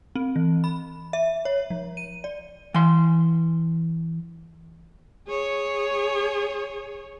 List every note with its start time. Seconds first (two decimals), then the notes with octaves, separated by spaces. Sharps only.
0.16 C4
0.36 E3
0.64 B5
1.13 E5
1.45 C#5
1.70 F3
1.97 D#7
2.24 D5
2.74 E3 C6
5.28 G#4 C#5